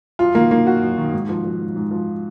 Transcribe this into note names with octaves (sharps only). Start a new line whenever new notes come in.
F#2 F4
D#3 A#3
D#3 A#3
F#2 F#4
F#2
D#3
G#2
F3
F3
G#2
G#2
F3